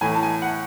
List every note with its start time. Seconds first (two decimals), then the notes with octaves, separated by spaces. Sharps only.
0.01 A2 E3 G#5
0.15 A5
0.22 G#5
0.42 F#5